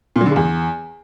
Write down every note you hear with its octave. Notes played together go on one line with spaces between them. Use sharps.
A#2
F#3
D3
C#3
E2